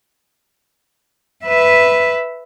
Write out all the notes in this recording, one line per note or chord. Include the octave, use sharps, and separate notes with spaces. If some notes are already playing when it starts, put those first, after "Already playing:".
B4 E5